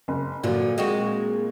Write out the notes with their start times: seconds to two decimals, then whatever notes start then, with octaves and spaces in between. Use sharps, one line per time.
0.08 F#1
0.44 A#2 D3 F3 F#3
0.78 G#3 C4 F#4